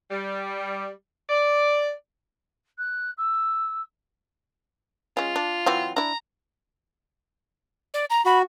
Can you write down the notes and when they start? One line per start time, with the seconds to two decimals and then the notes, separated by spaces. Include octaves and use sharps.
0.10 G3
1.29 D5
2.78 F#6
3.17 E6
5.17 G#3 C#4 F4
5.36 D4
5.66 E3 F#3 C4
5.96 D4 E4 A#5
7.94 D5
8.10 A#5
8.26 F#4 B5